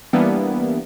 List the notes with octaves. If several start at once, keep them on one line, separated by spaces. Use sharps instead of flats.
E3 G3 A#3 B3 D4 E4